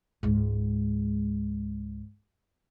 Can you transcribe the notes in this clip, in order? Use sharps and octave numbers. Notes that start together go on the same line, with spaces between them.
C#2 G#2